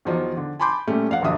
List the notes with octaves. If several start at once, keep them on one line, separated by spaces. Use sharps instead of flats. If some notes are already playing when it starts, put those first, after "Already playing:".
E2 D#3 F3 F#3 D#5
D3
G#5 A5 B5 C6 D6 G6
A#2 G3 A3 C#4
F2 F5 F#5
D#1 A#1 F#2 D3 E5 D#6